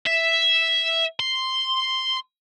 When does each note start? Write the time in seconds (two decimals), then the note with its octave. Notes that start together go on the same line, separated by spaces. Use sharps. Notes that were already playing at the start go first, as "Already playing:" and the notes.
0.07 E5
1.20 C6